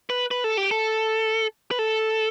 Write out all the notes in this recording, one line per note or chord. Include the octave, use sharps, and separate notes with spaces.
B4
B4
A4
G4
A4
B4
A4